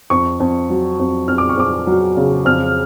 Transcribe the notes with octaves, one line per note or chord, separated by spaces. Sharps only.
F2 C#6
F2
F#3
F2
F2 F6
D6
C#6
F2 D6
F#3
C#3
F2 F6